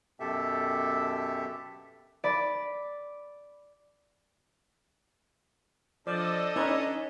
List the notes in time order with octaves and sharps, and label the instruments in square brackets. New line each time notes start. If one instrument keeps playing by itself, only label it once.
[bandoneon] F#2 B2 G4 A4 E5
[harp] D5 B5
[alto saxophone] F3 [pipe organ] D4 A4 D#5 [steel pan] D5
[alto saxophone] C#4 [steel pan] D#4 B4